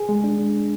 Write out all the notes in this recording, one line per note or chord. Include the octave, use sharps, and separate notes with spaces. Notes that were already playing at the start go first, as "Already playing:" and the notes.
Already playing: G#4
G#3
D4